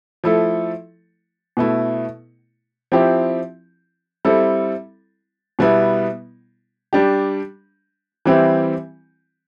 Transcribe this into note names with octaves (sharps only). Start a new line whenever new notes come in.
F3 A3 E4 A4
B2 A3 E4
F3 C4 E4 G4
G3 C4 E4 A4
B2 G3 B3 E4
G3 D4 G4
E3 G3 C4 E4 G4